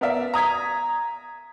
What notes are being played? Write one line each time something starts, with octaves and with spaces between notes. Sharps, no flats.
B3 A#4 D5 E5 F5
A#5 D#6 G#6 B6